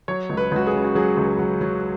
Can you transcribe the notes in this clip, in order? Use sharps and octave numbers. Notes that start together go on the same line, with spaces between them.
F#3 C#5
C#2
B4
C#2 F#4
G#4
C#3
F#4
F#3 G#4
C#2
F#3
F#3